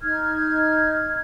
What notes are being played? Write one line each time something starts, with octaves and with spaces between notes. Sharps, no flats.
D#4 F6 G#6